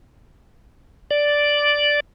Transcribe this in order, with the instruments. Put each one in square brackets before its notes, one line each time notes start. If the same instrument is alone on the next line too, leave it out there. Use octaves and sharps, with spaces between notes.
[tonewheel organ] D5